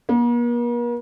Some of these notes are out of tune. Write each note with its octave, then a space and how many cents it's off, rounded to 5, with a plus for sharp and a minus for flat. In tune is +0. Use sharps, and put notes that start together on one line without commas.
A#3 +45